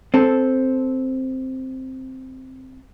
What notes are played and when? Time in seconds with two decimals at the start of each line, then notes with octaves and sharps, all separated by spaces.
0.14 C4 A4